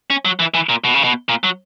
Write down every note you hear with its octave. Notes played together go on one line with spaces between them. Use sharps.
C#4
F#3
E3
E3
A#2
B2
C#3
B2
A#2
F#3